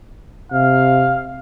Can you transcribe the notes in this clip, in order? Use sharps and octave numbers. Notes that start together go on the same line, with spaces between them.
C3 F5